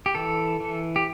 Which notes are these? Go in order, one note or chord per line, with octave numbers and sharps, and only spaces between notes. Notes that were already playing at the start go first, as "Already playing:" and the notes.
G4
E3 A4
E3
G4